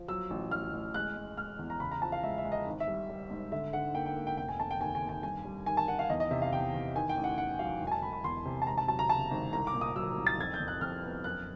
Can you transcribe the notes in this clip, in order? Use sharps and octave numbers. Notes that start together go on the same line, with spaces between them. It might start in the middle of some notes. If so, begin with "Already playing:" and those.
Already playing: F3
F#3 E6
A1
A1 F6
A1
G#3 F#6
G#3
G#3 F6
E2
A#5
C#3 B5
A#5
F3 A5
F5
G#3 E5
E5
G#3
D#5
G#1
E5
G3
G3
G#2
D3 E5
D3 F#5
A#3 G5
G5
A#3
G5
F1 G5
G#5
F1 A5
G5
D#2 G#5
G#5
D#2
G#5
G2 G#5
G3
D#3 G#5
A5
D#3 F#5
F5
E2 D#5
D#5
C3 E5
F5
E2 G5
E2
D#3 G#5
G5
A1
F#5
D#3 F#5
F#3 F5
E1
G#5
A5
E1 B5
B5
E2 C6
C3
A5
G#1 A#5
A5
F#3 A5
A#5
C#3 A5
G#1
C2 A#5
D6
A#2
D#6
F#3 E6
C2
A6
F2 G#6
G6
F2
F#6
F2 F6
B3
F#2 F#6